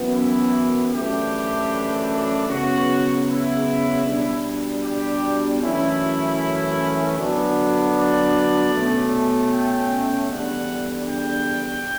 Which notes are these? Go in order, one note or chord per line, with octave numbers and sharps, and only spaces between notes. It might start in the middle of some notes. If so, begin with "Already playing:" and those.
Already playing: F#2 E3 B3
E4
F#2 E3 A3 D4 G4
C#3 F#3 B3 F#4
E4
B2 G3 D4
G4
F#2 E3 A3 C#4 E4
D3 F#3 B3 D4
D5
B2 A3 C#4
G5
E2 D3 G3 D4 F#5
G5